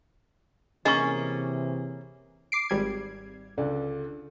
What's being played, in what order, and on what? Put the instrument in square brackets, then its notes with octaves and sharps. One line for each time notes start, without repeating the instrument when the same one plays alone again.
[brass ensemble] C3 E3 [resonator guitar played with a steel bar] A#3 C#4 G#4 [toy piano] D#5 C#6
[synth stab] D6 C7 D7
G#1 G3 G#6
[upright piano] C#2 D3 D5